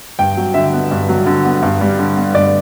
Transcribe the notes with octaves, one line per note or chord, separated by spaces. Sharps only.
G2 G5
F#3
D3 E5
B3
G2
F#3
D3
B3
G2
G3
D3
B3
G2 D5